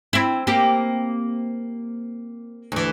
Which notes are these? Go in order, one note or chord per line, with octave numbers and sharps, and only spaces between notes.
C4 E4
A#3 C4 G4
D2 E3